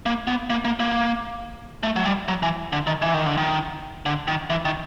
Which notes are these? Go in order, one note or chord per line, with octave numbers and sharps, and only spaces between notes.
A#3
B3
A#3
A#3
A#3
A3
F#3
G3
F#3
E3
D3
D#3
E3
D#3
D3
D#3
D3
D#3
E3
D#3